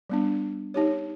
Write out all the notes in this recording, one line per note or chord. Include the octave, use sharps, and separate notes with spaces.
G3 B3 D4
D#4 G4 C#5